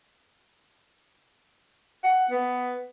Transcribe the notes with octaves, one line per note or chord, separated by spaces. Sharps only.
F#5
B3